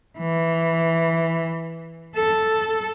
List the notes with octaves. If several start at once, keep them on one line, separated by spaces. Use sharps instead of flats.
E3
A4